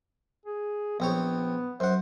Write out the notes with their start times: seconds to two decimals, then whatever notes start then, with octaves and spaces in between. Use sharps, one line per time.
0.45 G#4
1.00 A#1 B3 C4 C#5
1.80 F#2 C5 F#5